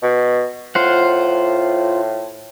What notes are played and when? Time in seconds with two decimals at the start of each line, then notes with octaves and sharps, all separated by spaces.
0.02 B2
0.75 A2 F4 C5 F#5